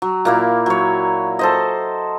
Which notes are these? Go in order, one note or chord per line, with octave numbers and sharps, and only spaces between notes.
F#3
A#2 A#3 E4
F#3 C#5
A4 C5 D#5